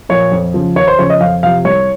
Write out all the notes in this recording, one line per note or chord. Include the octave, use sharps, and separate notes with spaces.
A#2 F3 C#5
F2
C#3 F3
D#2 C#5
C5
C#3 F3 C#5
D#5
F2 F5
C3 F3 F5
C2 C#5